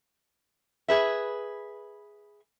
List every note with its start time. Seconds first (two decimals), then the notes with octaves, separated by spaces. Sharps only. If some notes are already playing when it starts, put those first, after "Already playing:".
0.88 G#4 B4 E5